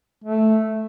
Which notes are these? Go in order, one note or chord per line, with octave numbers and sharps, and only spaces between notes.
A3